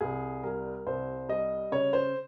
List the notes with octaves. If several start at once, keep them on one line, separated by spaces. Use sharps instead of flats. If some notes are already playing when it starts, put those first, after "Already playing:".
C2 G#4
G3 A#4
C2 C5
G3 D#5
C#3 C#5
C5